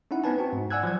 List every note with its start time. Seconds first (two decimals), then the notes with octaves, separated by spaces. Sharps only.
0.11 C#4 D#4 E4 F#5
0.24 B3 C4 D#4 B4 G#5 A5
0.38 C4 F#4
0.53 G#2
0.71 D5 F#5 G#5 E6 F#6 G#6
0.83 F3 F#3 G#6